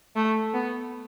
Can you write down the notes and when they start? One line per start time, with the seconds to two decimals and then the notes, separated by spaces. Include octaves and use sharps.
0.16 A3
0.54 B3